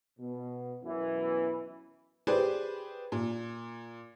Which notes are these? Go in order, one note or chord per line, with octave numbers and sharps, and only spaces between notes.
B2
F#2 B2 E3
G4 G#4 B4 C5 D5
A#2